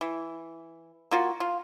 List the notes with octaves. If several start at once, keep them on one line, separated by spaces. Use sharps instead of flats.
E3
A#3 F4 F#4
F4